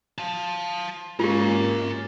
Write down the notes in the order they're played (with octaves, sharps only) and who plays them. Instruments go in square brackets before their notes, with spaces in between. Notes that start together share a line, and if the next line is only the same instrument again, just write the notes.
[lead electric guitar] F5 A5
[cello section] G#3 A#3 C#4 [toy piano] F4 G4 [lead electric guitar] A#4 G#5